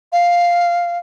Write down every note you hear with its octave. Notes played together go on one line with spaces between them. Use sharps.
F5